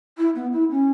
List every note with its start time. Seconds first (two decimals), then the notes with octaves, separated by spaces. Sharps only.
0.18 E4
0.35 B3
0.53 E4
0.70 C#4